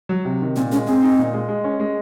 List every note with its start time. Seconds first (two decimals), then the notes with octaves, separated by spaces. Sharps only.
0.09 F#3
0.25 C3
0.41 D#3
0.56 A#2 C4
0.72 G#3 C#4
0.87 C4 G#4
1.02 D#4
1.19 A#2
1.34 G#3
1.49 G#3
1.64 C#4
1.80 G#3